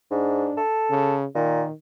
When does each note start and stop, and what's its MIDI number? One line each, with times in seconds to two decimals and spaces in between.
0.11 0.51 44
0.11 0.60 62
0.57 1.15 69
0.90 1.26 49
1.35 1.64 46
1.35 1.72 51